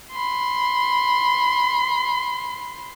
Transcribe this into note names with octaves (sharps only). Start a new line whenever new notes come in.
B5 C6